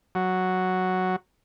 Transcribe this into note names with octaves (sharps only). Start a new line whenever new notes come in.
F#3